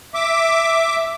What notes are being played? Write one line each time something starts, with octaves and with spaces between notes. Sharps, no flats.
E5 D6